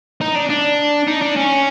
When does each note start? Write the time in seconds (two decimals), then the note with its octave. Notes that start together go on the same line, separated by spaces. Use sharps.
0.21 D#4
0.36 D4
0.50 D4
1.08 D#4
1.22 D4
1.36 C#4